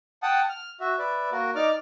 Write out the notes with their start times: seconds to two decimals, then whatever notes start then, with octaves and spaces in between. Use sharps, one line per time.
0.23 F#5 G5 A5 D#6
0.49 F6
0.80 F#4 E5
0.98 B4 D5 E5
1.32 A#3 F#4 A#4
1.55 D#4 D5 D6 F6